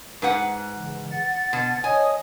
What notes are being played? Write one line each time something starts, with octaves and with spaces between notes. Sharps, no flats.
G#2 B4 F#5
C#3 E3
F#5 A6
B2
C#5 D#5 G#5 D#6